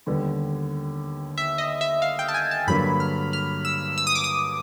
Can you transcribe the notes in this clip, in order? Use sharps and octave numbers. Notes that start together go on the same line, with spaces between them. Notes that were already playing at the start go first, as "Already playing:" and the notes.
D#2 D3 G3 B3
E5
D#5
E5
F5
G5
A5
G#5
A5
G2 D3 F#3 A#3 D4 B5
F6
F6
E6
E6
D#6
D6
D#6